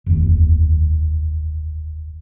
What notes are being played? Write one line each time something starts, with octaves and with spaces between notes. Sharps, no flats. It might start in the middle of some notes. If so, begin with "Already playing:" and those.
F1 D#2